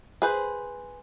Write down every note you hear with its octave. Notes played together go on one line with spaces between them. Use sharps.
G#4 B4 C5